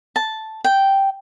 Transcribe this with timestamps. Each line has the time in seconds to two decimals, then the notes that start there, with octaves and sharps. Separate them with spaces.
0.16 A5
0.64 G5